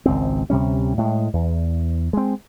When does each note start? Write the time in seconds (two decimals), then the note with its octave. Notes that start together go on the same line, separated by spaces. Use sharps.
0.06 G#1 C#2 C4
0.50 D2 C3 G3 C#4
0.98 A2 G#3
1.33 E2
2.13 G#3 C4